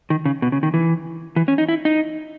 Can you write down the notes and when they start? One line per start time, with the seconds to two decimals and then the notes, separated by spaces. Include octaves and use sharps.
0.10 D#3
0.25 C#3
0.42 B2
0.52 C#3
0.63 D#3
0.74 E3
1.36 E3
1.48 C#4
1.58 D#4
1.69 E4
1.85 D#4